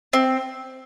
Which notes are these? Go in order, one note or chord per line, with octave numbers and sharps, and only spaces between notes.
C4